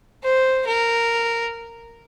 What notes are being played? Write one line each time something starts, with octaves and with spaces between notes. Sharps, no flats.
C5
A#4